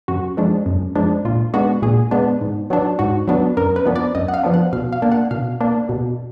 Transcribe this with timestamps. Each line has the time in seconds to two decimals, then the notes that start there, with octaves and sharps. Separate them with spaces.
0.08 F#2 F#4
0.37 F3 G#3 D4
0.66 F#2
0.96 F3 G#3 D4
1.25 A#2 F4
1.54 G#3 B3 D4 F#4
1.82 A#2 G#4
2.11 G#3 B3 D4
2.41 G#2
2.70 F#3 B3 D4
2.99 G#2 F#4
3.28 F#3 B3 D4
3.57 F#2 A#4
3.76 B4
3.86 F3 B3 D4
3.96 D5
4.15 F#2 D#5
4.28 F#5
4.34 F5
4.44 F3 B3 D4
4.54 F#5
4.73 B2 F5
4.92 F5
5.02 A#3 D4
5.12 F#5
5.31 B2 F5
5.61 A#3 D4
5.89 B2